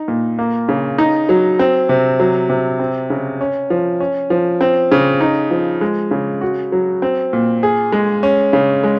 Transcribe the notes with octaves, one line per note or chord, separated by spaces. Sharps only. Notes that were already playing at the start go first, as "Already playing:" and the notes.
Already playing: D#4
A#2
A#3
C#3
D#4
F#3
C4
C3
F#3
C3
C4
C#3
C#4
F3
C#4
F3
C4
C#3
D#4
F3
G#3
C#3
F#4
F#3
C4
A#2
G#4
G#3
C#4
C#3
G#3